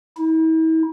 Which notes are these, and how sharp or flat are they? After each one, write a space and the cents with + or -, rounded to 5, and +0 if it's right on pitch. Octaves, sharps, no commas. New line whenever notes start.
E4 -45